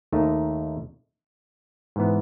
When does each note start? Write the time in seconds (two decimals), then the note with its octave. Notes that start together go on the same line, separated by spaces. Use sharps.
0.12 D#2 D#3 A3 D#4
1.96 G#2 E3 B3